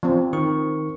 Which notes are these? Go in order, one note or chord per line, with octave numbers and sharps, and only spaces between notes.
F3 C4
D#3 C#6